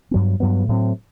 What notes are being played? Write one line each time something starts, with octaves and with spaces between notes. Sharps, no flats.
G2 F#3 B3
G2 F#3 B3
A2 F#3 C4